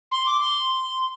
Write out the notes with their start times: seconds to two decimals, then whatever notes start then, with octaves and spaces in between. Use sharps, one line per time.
0.12 C6
0.26 D6
0.40 C6